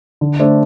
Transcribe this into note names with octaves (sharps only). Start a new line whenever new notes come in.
D3
A3 D4 C5